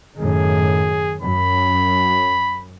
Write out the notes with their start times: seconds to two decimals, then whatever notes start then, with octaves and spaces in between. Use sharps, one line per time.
0.18 F#2 A2 D#3 G#4
1.22 F#2 B5